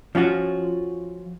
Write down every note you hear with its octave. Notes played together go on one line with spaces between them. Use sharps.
F3 C#4 F4 F#4